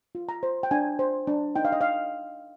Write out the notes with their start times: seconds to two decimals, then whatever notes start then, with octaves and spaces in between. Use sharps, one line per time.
0.15 F4
0.29 A#5
0.43 C5
0.63 G5
0.71 D4 G#5
0.99 C5
1.27 D4
1.55 D#4 G5
1.65 F5
1.72 D#5
1.81 F5